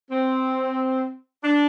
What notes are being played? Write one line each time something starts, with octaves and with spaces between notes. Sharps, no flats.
C4
D4